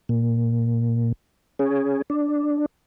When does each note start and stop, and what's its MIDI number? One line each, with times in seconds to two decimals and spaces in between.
0.09 1.12 46
1.59 2.02 61
1.59 2.02 68
2.10 2.66 62